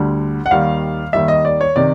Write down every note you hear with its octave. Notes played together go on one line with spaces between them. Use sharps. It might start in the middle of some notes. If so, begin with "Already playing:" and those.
Already playing: D2 D3 G3
F#5
D#2 D#3 G3 F5
D#2 D#3 G3 E5
D#5
D5
C#5
C3 D#3 D5